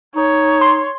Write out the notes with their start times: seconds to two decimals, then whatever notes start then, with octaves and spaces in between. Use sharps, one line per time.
0.16 D#4 C#5
0.61 C6